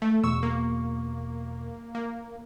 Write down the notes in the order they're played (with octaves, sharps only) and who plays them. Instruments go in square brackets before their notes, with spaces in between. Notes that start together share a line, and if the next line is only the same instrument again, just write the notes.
[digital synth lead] A3
[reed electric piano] E2 B2 C#6 [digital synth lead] E6
[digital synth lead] A#3
A#3